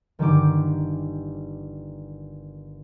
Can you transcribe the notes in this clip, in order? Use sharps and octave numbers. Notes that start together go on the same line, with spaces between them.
G1 D#3 G3 G4 D6 D7